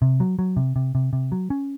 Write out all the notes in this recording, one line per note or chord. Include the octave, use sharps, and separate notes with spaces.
C3
F#3
F#3
C3
C3
C3
C3
F#3
C#4